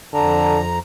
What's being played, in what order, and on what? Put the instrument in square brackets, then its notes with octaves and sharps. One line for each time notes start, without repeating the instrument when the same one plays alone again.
[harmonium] F2 A#5 [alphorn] D3 [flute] A5